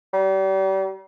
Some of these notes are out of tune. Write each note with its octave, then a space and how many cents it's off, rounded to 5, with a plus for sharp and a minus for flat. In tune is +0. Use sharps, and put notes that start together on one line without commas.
G3 -35